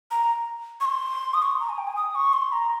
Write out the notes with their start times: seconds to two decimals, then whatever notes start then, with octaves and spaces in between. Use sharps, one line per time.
0.11 A#5
0.81 C#6
0.85 C6
1.34 D#6
1.42 C#6
1.51 C6
1.60 A#5
1.69 G#5
1.78 G5
1.87 G#5
1.96 D#6
2.15 C#6
2.33 C6
2.52 A#5